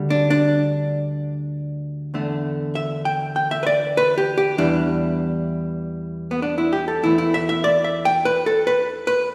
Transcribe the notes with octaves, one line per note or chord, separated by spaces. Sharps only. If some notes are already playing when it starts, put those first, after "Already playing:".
Already playing: D2 D3 G3
D4
D4
E2 D3 A3
E5
G5
G5
E5
B4
D5
B4
G4
G4
E2 E3 G3 D4
B3
D4
E4
G4
A4
E2 E3 A3 E4
E4
E5
E5
D5
E5
G5
B4
A4
B4
B4